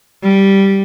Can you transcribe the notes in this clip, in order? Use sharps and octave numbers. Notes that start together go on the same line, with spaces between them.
G3